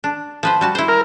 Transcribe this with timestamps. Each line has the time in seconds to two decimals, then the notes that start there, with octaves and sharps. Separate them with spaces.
0.04 D4
0.43 F3 B4 C5
0.61 G3 F#4 A5
0.75 E4 C5
0.88 A#4